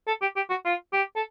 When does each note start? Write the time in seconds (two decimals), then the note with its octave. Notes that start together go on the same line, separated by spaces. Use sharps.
0.07 A4
0.21 G4
0.36 G4
0.50 F#4
0.65 F4
0.93 G4
1.16 A4